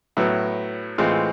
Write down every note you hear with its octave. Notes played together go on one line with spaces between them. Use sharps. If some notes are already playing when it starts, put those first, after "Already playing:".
A2 F#3 B3 E4
A2 E3 G#3 C4 F4